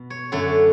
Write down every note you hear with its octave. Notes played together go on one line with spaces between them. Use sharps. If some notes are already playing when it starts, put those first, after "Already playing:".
Already playing: B2
C#5
F#2 D3 A3 C#5